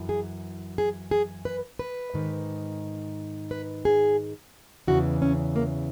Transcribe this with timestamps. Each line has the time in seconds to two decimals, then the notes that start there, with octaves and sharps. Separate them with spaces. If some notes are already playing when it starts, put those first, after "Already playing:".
Already playing: F#2 E3
0.09 G#4
0.78 G#4
1.11 G#4
1.45 B4
1.79 B4
2.14 G#2 D#3
3.51 B4
3.85 G#4
4.87 E2 C#3 E3 F#4
5.22 C#4
5.56 A#3